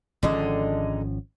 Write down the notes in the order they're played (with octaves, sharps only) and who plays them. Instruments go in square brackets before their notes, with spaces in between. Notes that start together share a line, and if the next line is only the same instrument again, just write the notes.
[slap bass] G#1 F3 C#4 [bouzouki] D3 G#3 D#4